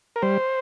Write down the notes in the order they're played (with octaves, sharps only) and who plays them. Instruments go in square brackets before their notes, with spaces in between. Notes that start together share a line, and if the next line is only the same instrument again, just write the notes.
[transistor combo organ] A#4
G3 C5